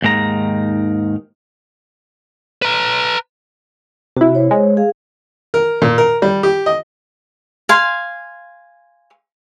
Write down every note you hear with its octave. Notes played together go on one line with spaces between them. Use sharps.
D#2 G#2 D#3 A#5
B4 A#5
C3 E4 F#4
C5 C#5
G#3
G#4 F5
A#4
A#2
A#4
G3
G4
D#5
F5 G#5 C6